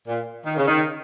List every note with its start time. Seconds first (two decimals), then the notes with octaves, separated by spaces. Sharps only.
0.08 A#2
0.45 D#3
0.57 C#3
0.68 D#3